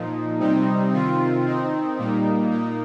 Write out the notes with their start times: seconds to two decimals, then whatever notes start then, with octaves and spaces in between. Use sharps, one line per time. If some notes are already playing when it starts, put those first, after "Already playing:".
Already playing: A#2 F3 D#4
0.39 C3 G3 C4 D#4
0.92 C3 D#3 C4 F4
1.46 D#3 C4 D#4
1.98 A#2 G3 A#3 D#4
2.51 A#2 A#3 D#4